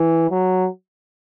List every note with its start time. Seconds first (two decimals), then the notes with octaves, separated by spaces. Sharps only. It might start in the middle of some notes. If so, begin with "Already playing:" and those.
Already playing: E3
0.31 F#3